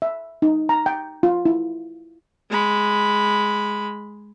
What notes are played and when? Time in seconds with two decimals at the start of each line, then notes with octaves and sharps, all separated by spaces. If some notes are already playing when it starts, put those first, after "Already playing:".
0.02 E5
0.42 D#4
0.69 A#5
0.86 G5
1.23 F4
1.45 E4
2.50 G#3 B5